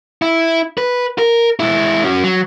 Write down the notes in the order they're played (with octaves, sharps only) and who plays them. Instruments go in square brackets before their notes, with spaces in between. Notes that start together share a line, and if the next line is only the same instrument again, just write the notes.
[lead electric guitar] E4
B4
A#4
G#3 E4
C#4 F#4
F#3